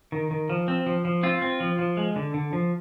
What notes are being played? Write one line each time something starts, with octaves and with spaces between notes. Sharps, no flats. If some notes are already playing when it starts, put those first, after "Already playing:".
D#3
D#3
F3
C4
F3
F3
C4 F4
C4
F3
F3
G#3
D3
D3
F3